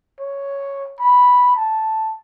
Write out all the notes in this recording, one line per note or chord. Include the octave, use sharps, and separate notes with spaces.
C#5
B5
A5